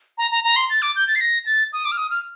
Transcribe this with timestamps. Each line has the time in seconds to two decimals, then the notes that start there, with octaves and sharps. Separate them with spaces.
0.18 A#5
0.31 A#5
0.44 A#5
0.56 C6
0.70 A6
0.82 D6
0.96 G6
1.08 A6
1.15 C7
1.21 A#6
1.46 A6
1.73 D#6
1.85 D6
1.92 F6
1.98 D#6
2.10 F6